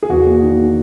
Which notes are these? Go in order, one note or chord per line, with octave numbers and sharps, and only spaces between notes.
G#4
E2 F#4
A#3
D#3